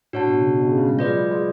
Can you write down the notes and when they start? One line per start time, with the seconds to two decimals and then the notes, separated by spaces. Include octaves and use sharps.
0.13 A2 D4 F#4 C#5 F#5 A5
0.28 B2
0.42 C#3
0.56 B2
0.67 C#3
0.78 C#3
0.89 G#3
0.99 G#3 F4 B4 D5
1.10 F#3
1.32 G#3